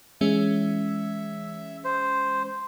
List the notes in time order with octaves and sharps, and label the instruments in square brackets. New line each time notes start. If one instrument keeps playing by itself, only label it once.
[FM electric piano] E3 G#3 C#4 [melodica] E5
[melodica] C5